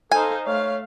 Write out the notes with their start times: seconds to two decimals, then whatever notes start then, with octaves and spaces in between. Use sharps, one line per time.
0.12 D#4 A4 C5 F5 G#5
0.46 A3 C#5 F5